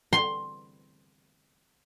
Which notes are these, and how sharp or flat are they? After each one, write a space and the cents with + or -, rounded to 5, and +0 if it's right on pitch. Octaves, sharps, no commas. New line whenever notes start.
C6 +10